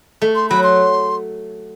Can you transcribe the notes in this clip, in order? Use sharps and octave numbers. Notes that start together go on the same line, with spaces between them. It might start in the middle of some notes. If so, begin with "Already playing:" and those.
A3
C6
F#3 B5
C6